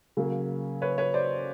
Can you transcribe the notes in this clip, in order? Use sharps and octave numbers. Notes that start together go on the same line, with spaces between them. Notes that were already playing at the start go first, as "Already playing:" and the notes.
C#3 F#3 A#3
B4 C#5
B4 C#5
C5 D5